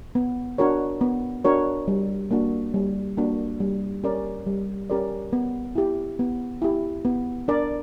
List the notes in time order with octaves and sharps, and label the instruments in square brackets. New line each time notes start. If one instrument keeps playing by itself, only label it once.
[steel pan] B3
D4 F#4 A#4 C#5
B3
D4 F#4 A#4 C#5
G3
A#3 D4 F#4
G3
A#3 D4 F#4
G3
C#4 G4 A#4 D5
G3
C#4 G4 A#4 D5
B3
E4 G4
B3
E4 G4
B3
D4 A#4 D5